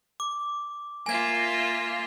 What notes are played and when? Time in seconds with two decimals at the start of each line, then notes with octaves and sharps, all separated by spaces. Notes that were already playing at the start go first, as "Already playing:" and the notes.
0.20 D6
1.06 A#3 F4 E5 G#5 G#6